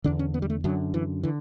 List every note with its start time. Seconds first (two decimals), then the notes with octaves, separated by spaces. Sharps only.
0.04 E2 D3 D4
0.19 C#4
0.34 B3
0.42 G3
0.50 A3
0.64 F#2 D3 F#3
0.94 E3
1.23 D3 E3